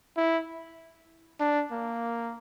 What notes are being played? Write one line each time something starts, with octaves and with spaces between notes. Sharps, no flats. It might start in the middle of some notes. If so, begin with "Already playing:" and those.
E4
D4
A#3